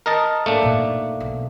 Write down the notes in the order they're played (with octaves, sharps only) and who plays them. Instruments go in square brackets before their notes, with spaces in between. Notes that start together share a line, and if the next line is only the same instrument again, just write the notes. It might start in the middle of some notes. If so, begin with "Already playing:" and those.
[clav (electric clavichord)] A#4 D#5 A5
[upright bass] A1 [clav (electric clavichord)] A3 A#3 D4
[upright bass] A#2 D#4
B1